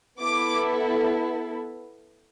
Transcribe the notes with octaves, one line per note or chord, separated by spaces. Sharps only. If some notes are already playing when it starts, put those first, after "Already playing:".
B3 E4 A4 D6